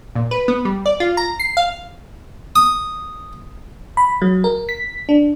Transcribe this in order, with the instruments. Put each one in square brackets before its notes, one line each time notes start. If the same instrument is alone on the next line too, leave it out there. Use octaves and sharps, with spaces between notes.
[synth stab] A#2
B4
B3
G3
D5
F4
A#5
C7
F5
[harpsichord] D#6
[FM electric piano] B5
F#3
A#4
B6
D4